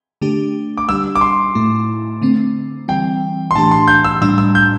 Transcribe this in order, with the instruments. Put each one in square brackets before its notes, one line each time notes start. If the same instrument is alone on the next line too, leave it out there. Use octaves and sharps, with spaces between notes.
[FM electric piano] D3 A3 D4 G4
[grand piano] D6
[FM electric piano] G3 D4 G4 [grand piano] E6
[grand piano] D6
C6
[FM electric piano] A2 A3 E4
D3 A3 C4
[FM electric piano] E3 G3 C4 [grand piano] G5
[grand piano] C6
[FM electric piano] A2 E3 A3 D4 G4 [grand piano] A5
[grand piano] C6
G6
E6
[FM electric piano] A2 G3 D4 [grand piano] E6
[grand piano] E6
G6